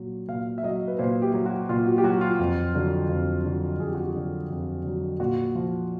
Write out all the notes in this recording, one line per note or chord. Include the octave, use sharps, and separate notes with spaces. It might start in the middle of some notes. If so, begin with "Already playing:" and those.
Already playing: A#2 F#3
A#2 F5
E5
F#3 D#5
B4
A#2 C5
G4
F#3
F#4
A#2 F4
F#4
G4
F#3 F#4
F4
F2
D3 F#3
F2
D3 F#3
F2 G#4
G4
F#4
G4
D3 F#3
F2
D3 F#3
A#2 F#4
F3